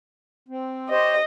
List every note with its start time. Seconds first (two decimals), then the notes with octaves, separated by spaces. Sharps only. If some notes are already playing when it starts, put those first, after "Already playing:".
0.48 C4
0.90 G4 C5 C#5 D#5